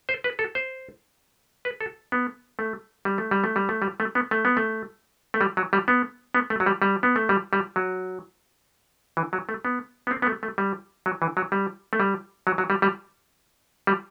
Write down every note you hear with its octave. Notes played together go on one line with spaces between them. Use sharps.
C5
B4
A4
C5
B4
A4
B3
A3
G3
A3
G3
A3
G3
A3
G3
A3
B3
A3
B3
A3
A3
G3
F#3
G3
B3
B3
A3
F#3
G3
G3
B3
A3
G3
G3
F#3
E3
F#3
A3
B3
B3
C4
B3
A3
A3
G3
F#3
E3
F#3
G3
A3
G3
F#3
F#3
G3
G3
G3